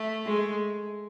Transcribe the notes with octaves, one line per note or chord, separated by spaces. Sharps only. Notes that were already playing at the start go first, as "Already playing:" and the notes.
Already playing: A3
G#3